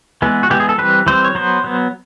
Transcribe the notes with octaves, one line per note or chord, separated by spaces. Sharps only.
E3 G#3 B3
F#4
E3 G#3 B3 G4
G#4
A4
E3 G3 C4 B4
E3 G3 C4 C5
C#5
F#3 B3 C5
F#3 B3